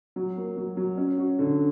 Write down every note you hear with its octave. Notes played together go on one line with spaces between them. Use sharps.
F#3
A#3
F#3
F#3
C#4
F#4
D3